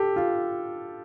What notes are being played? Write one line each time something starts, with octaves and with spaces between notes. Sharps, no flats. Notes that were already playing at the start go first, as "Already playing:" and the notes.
Already playing: G4 A4
F4